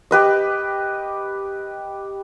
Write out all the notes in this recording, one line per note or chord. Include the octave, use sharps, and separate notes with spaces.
G4 B4 D#5